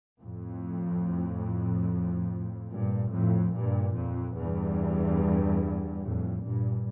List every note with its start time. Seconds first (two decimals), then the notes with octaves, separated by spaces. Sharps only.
0.20 F2 A2
2.69 G2 A#2
3.10 F2 A2
3.53 G2 A#2
3.94 F2
4.35 E2 G2
6.02 F2 A2
6.43 G2 A#2